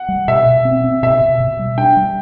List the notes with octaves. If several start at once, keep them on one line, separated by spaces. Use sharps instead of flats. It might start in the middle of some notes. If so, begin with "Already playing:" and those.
Already playing: F#5
G3
B2 E5
B2
C4
C4
B2 E5
B2
B2
G3
D4 G5
G3